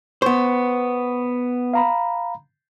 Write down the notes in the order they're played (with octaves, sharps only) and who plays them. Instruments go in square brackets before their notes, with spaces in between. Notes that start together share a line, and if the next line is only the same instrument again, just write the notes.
[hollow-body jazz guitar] B3 C5 [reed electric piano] C#6
[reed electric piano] F5 A#5 B5